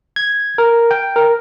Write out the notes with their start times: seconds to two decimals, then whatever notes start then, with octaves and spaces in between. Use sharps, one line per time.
0.16 G#6
0.58 A#4
0.91 G5
1.16 A#4